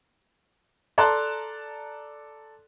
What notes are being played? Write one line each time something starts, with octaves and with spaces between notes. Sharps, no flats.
A4 D5 A5 A#5 C6 F#6